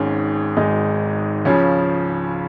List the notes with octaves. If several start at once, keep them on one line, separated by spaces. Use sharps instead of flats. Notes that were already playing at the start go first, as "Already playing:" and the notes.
Already playing: G#1 G#2 G#3 C#4
G#1 G#2 G#3 D#4
C#2 C#3 F3 C#4